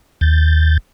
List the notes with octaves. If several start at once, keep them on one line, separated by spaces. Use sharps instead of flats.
D#2 G6 A6